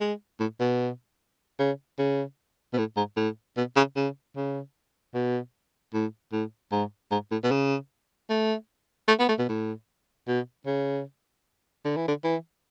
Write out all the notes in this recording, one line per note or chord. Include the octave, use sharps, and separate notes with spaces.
G#3
A2
B2
C#3
C#3
B2
A2
G#2
A2
B2
C#3
C#3
C#3
B2
A2
A2
G#2
G#2
A2
B2
C#3
A3
A3
B3
A3
B2
A2
B2
C#3
D3
E3
D3
E3